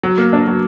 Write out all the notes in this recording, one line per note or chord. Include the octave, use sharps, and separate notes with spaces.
F#3
A#3
D4
F#3